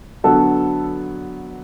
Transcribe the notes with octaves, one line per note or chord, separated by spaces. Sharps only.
D3 F#3 B3 A4